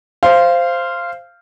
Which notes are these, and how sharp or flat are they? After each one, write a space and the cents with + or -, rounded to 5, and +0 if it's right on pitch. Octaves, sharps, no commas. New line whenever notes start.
C5 +0 F5 -15